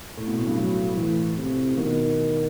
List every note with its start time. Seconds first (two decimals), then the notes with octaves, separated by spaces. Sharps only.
0.17 A2
0.27 B2
0.37 A2
0.47 G2
0.57 F#3
0.96 A2 E3
1.37 C3
1.77 B2 D#3